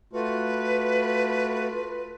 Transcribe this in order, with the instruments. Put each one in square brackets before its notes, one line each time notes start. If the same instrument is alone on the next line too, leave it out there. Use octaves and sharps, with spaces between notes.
[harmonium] A3 F4 F#4 [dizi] B4